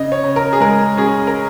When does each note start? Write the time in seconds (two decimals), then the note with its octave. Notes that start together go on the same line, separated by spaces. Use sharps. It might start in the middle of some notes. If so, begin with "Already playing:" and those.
Already playing: C#3 D#5
0.12 C#5
0.24 C#3
0.36 A#4
0.53 G#4
0.60 G#3 A#4
0.97 C#4 G#4
1.27 A#4